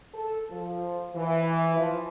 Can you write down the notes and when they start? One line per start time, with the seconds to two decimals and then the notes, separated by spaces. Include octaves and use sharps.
0.14 A4
0.51 F3
1.16 E3
1.76 F3